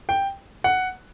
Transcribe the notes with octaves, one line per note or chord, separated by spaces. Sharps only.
G5
F#5